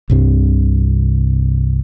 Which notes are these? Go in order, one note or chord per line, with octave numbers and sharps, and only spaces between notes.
C2 G2 C3